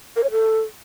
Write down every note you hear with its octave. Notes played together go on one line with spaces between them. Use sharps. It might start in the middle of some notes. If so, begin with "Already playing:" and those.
A#4
C#5
A4